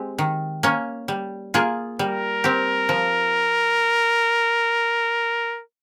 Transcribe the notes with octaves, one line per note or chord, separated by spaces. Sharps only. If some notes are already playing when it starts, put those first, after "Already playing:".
Already playing: G#3 C4 G4
D#3
A#3 C#4
G3
A#3 F4 G#4
G3 A#4
C4 G4
F3